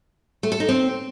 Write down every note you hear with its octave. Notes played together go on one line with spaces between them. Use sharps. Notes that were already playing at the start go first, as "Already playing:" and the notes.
A3
A4
D#4
C4